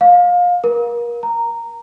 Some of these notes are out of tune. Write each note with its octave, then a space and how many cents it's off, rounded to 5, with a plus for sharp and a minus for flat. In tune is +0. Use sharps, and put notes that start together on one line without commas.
F5 +25
A#4 +30
A#5 -10